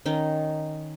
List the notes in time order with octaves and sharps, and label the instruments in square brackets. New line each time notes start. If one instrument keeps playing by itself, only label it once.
[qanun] D#3 C#4 D#4